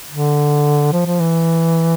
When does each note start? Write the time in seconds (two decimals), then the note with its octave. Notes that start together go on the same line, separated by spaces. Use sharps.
0.10 D3
0.93 F3
1.06 F3
1.20 E3